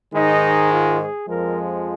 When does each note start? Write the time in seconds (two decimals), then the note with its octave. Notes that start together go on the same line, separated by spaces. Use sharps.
0.14 G#2 D#3 G#3 D#4
0.71 F4
0.99 G#4
1.28 F2 F3 G#3 A#4